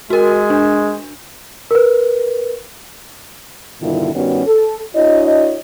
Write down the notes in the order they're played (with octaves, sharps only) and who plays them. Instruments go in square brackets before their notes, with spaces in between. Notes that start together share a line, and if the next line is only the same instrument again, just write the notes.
[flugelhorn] G#3 [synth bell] F#4 A#4
[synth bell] D4
[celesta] A#4 B4
[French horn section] G2 B2 D3 D#3 E4 F4
G2 D#3 G3 B3 C#4 F#4
A4
D4 E4 F#4 C#5 D#5